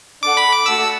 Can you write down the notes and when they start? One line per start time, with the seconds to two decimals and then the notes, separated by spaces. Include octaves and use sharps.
0.23 D4 A4 D5 F#5 D6
0.37 B5
0.52 D6
0.66 A3 F#4 A4 F#5 A5 E6